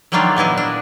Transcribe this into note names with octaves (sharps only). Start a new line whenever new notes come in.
D#3 F#3 G3 A#3 D4 F4
A#2 B3 E4 D#5
D4